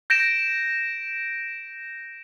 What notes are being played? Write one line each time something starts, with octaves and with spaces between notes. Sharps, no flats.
G6 A#6 D7 E7